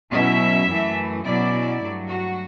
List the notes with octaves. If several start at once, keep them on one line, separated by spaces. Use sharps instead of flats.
B2 F#3 C#4 E4 E5
F#2 E3 A3
B2 F#3 C#4 E4 D5
G2 F#3 A3
F#4